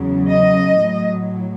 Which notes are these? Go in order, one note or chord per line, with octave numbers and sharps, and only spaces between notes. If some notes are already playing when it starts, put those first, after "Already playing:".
Already playing: E2 C#3 F#3
D#5
A2 F#3